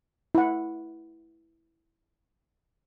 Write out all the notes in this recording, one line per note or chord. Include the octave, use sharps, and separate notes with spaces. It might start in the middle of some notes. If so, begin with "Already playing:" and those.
E4 F#5